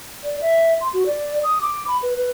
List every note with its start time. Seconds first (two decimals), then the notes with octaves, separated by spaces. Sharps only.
0.24 D5
0.41 E5
0.81 C6
0.94 F#4
1.06 D5
1.43 D#6
1.61 D6
1.88 B5
2.02 B4
2.17 B4